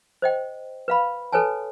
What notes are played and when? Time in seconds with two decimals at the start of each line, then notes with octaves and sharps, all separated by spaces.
0.22 C5 D#5 G5
0.88 B4 F5 B5
1.33 A4 B4 C#5 G#5 A5